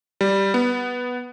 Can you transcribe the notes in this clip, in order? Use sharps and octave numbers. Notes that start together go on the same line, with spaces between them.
G3
B3